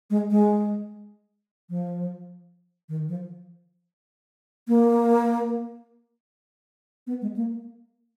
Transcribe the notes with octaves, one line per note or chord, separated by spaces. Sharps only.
G#3
G#3
F3
D#3
F3
A#3
B3
G#3
A#3